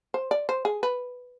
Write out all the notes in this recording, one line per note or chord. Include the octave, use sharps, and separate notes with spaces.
C5
D5
C5
G#4
B4